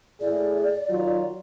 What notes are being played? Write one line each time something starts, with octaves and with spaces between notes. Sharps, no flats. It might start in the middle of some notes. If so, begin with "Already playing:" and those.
A2 E4 G#4 D5
D#3 F#3 F4